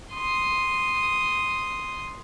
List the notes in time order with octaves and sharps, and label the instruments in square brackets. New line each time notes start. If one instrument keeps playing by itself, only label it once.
[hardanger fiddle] C6 D#6